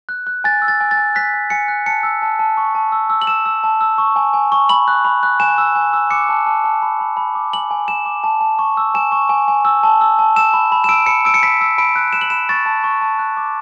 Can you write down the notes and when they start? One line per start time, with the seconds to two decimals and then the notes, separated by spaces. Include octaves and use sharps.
0.09 F#6
0.27 F#6
0.44 G#5 A6
0.62 E6
0.68 A6
0.81 G#5
0.91 A6
0.97 G#5
1.15 F#6 B6
1.33 G#5
1.50 G#5 C#7
1.68 F#6
1.86 A5 C#7
2.03 E6
2.22 A5
2.39 A5
2.57 C#6
2.75 A5
2.92 E6
3.10 E6
3.22 F#7
3.27 E6 E7
3.46 E6
3.64 A5
3.81 E6
3.98 C#6
4.16 G#5
4.33 G#5
4.52 C#6
4.69 B5 F#7
4.88 F#6
5.05 B5
5.23 F#6
5.40 G#5 E7
5.58 E6
5.76 G#5
5.93 E6
6.11 D6 C#7
6.29 A5
6.47 A5
6.64 A5
6.82 B5
7.00 B5
7.17 B5
7.35 D6
7.53 G#5 F#7
7.71 G#5
7.88 G#5 E7
8.06 D6
8.24 A5
8.41 A5
8.59 C#6
8.77 E6
8.94 G#5 E7
9.12 C#6
9.29 G#5
9.48 G#5
9.65 E6
9.83 A5
10.01 E6
10.19 A5
10.36 E6 E7
10.54 B5
10.72 B5
10.84 E7
10.89 E6 D7
11.06 B5 C#7
11.25 E6 D7
11.34 C#7
11.42 B5 B6
11.61 E6
11.78 B5 D7
11.96 F#6
12.13 F#6 E7
12.21 F#7
12.30 B5 E7
12.49 C#6 A6
12.66 A5
12.84 C#6
13.02 A5
13.19 F#6
13.37 D6